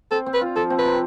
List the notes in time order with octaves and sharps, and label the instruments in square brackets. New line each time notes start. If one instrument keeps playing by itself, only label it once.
[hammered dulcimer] C4 [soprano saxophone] A4
[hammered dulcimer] C4
[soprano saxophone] B4
[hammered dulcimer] F4
[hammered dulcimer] F3 [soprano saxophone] A4
[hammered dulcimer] C4
[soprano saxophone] B4
[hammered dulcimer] C3